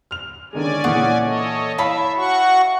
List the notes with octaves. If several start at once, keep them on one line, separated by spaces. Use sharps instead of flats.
F6 F7
D3 D#3 G#3 C#4 D5 G#5
A#2 E3 G#4 F#5 C#6
A4 C#5 D#5
E4 C#5 E5 F5 A5 B5
F#4 F#5 C#6